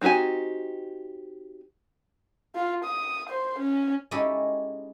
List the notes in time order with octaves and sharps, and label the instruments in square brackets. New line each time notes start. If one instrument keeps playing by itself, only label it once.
[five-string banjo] C4 D#4 F#4 G4 G#5
[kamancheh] F4
D#6
C5
C#4
[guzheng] G#3 C#4 D#4 E4 G4 A4